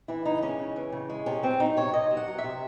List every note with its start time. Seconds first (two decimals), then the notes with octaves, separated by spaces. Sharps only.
0.08 E3 E4
0.25 C#3 D#4
0.42 G#3 C#4
0.59 C#3
0.76 E3
0.92 C#3
1.10 G#3
1.26 C3 C#4
1.43 F#3 C4
1.60 F#3 D#4
1.77 C3 C#5
1.93 C3 D#5
2.11 F#3
2.17 F#5
2.28 F#3
2.38 E5
2.44 C3